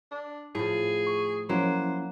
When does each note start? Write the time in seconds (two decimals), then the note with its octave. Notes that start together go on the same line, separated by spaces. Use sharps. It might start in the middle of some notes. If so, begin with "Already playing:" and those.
0.11 D4
0.55 A2 F3 G#4
1.07 C#6
1.49 F3 F#3 A#3 C#4 E4 B4 C5